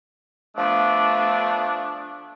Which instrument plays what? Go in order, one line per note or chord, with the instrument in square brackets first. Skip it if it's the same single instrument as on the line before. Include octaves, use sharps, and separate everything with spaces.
[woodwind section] F3 A3 B3 D4